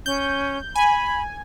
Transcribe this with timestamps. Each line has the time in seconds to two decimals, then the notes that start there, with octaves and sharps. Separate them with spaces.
0.06 C#4 G6
0.76 G#5 B5